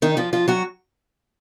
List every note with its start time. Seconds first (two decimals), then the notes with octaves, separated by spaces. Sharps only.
0.02 D#3 D#4
0.17 F3 F4
0.33 F3 F4
0.48 F#3 F#4